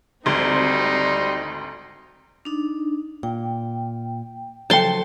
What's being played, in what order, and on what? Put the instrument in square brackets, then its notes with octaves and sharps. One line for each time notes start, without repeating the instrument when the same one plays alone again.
[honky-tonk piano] G#1 D2 [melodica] G3 C6 [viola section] C4 F#4 [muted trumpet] D#4
[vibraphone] D4 D#4
[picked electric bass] A#2 [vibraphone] G5
[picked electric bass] C#3 F3 F#3 [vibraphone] A4 [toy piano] C#5 G5 [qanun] A5 C6